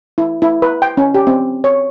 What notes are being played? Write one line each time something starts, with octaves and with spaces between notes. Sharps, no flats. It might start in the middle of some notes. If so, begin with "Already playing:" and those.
E4
E4
B4
G5
C#4
G4
C4
C#5